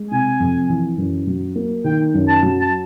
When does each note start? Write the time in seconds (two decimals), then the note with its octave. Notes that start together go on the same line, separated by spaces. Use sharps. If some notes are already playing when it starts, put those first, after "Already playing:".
Already playing: G#3
0.11 C3 G#5
0.40 F2
0.69 E3
0.98 F#2
1.27 F#3
1.56 A#3
1.84 D#3 G5
2.14 F#2
2.28 A5
2.43 F#3
2.61 A5